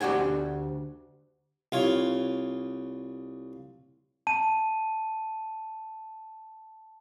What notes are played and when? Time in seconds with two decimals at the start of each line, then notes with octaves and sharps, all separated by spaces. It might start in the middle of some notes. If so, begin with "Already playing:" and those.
0.01 D2 D4 F#4 G4 G#5
1.72 C2 F4 C#5
4.27 A5 D#7